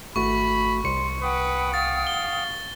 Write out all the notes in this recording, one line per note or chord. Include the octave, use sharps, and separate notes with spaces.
G#1 A3 F#4 B5 C#6
C2 C6 C#7
B4 F#5 G5 D#6
F5 A6
G7